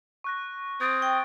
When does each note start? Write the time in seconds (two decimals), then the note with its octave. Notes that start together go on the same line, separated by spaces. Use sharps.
0.24 C#6 F#6 A#6
0.81 C4 D#6 G#6 A6 D7
1.02 G5